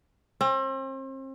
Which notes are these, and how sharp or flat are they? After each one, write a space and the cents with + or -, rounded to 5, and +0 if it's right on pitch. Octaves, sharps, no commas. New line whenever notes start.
C4 +40